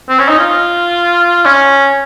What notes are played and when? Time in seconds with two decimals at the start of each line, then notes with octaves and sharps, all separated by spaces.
0.09 C4
0.19 C#4
0.29 D#4
0.39 F4
1.45 C#4